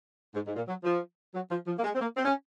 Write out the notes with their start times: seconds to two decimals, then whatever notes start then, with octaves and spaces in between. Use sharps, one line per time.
0.34 G#2
0.45 G#2
0.56 A#2
0.67 F#3
0.83 F3
1.34 F#3
1.50 F3
1.66 F3
1.78 A#3
1.83 G#3
1.94 C4
2.00 A#3
2.16 C4
2.24 C#4